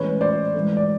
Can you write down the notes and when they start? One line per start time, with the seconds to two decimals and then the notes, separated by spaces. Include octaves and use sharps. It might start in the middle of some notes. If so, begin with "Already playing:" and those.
Already playing: A2 E3 G#3 C#4 B4 C#5
0.21 C5 D5
0.54 G#2 E3 A3
0.77 D5